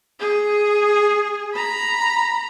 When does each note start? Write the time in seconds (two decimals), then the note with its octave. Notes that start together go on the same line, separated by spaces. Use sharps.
0.19 G#4
1.54 A#5 B5